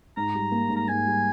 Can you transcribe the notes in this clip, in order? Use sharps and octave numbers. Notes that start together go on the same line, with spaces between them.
G#2 A#5
G3
A#3
G#2
A#5
G#2 G#5
G3